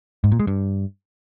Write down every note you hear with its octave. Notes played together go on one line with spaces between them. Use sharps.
G#2
A#2
G#3
G2